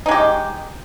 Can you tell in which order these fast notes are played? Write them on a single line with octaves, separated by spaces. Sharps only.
D#4 G#3 G4